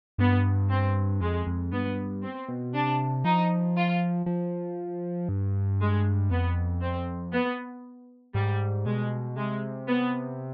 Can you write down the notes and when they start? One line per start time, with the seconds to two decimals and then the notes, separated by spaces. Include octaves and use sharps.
0.18 G2 B3
0.69 C4
1.21 F2 G#3
1.46 F2
1.72 G2 B3
2.22 C4
2.48 B2
2.74 C3 D4
3.24 F3 D#4
3.76 F4
4.26 F3
5.29 G2
5.80 G#3
6.30 F2 B3
6.81 C4
7.32 B3
8.34 G#2 G3
8.85 B2 G#3
9.37 C3 G#3
9.87 B3